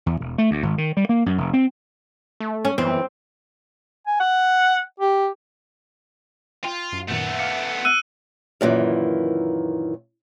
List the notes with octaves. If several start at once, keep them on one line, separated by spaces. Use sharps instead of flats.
E2
E1
A3
D2
G#1
D#3
G3
A#3
F#2
F1
C4
A3
C#4
F#2 E3 B3 C4
G#5
F#5
G4
F4 G5
F#2
F#2 A#2 D#3 A3 B3
F5 D6 F6 C#7
E6 F#6 D#7
F#2 A#2 D#3 E3